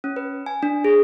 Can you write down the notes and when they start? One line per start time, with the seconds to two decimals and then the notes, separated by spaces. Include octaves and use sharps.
0.04 C#4
0.16 B4
0.46 G#5
0.63 D4
0.84 G#4